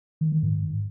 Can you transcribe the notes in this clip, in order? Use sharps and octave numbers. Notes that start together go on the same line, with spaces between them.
D#3
D#3
G#2